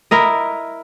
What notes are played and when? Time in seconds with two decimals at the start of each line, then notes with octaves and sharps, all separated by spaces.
0.11 E4 A#4 D#5